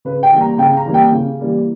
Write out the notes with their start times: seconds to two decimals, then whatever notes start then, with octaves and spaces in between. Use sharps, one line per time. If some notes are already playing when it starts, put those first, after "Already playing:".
0.05 C#3 B4
0.23 G5
0.32 E3 G3 A#3
0.40 A#5
0.58 C#3 G5
0.77 A#5
0.86 E3 G3 A#3
0.94 G5
1.12 C#3
1.39 E3 G3 A#3